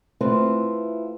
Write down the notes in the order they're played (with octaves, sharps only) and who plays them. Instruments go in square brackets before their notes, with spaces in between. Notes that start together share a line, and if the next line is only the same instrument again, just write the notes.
[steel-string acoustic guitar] A3 C4 E4 F4 B4